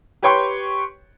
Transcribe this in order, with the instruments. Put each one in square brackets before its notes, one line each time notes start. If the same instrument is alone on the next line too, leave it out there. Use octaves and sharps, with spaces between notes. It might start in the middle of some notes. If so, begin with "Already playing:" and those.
[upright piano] G4 B4 C#5 G5 C6 C#6